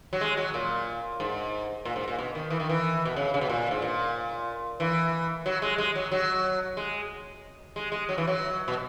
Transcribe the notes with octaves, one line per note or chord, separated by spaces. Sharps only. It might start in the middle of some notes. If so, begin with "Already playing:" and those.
F#3
G#3
F#3
A#2
G#2
A#2
G#2
A#2
B2
D#3
E3
D#3
E3
B2
C#3
C#3
B2
A#2
G#2
A#2
E3
F#3
G#3
G#3
F#3
F#3
G#3
G#3
G#3
F#3
E3
F#3
B2